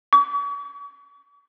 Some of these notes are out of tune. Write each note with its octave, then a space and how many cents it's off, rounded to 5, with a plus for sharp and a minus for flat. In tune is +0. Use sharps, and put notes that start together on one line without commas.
C#6 +45